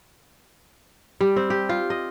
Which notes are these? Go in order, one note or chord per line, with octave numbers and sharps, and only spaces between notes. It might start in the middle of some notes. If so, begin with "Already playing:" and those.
G3
C4
G4
F4
D#5